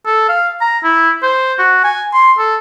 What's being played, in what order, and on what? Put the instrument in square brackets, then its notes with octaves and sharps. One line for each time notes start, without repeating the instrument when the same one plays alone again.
[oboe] A4
F5
A#5
E4
C5
F#4
G#5
C6
A4